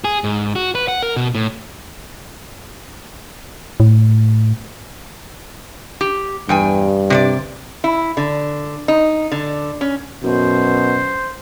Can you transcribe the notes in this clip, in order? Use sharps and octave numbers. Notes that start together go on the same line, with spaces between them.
G#4
G#2
F#4
B4
F#5
A#4
B2
A2
A2
G4
E2 G2 G5 G#5
C3 C#5 D5
E4
D3
D#4
D3
C#4
F#2 B2 C5